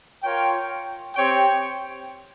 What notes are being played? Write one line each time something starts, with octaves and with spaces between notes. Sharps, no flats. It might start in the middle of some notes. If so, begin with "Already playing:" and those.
F4 A#4 C#5 G5
C4 G4 C#5 G5